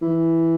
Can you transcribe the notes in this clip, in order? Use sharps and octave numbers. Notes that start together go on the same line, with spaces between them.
E3